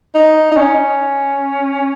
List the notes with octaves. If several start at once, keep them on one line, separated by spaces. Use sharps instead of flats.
D#4
D#4
C#4